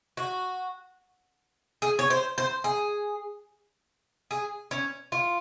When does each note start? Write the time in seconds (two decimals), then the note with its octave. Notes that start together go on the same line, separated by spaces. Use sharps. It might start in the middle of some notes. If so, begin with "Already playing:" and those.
0.17 F#4
1.82 G#4
1.99 C#5
2.10 C5
2.38 C5
2.64 G#4
4.31 G#4
4.71 C#4
5.12 F4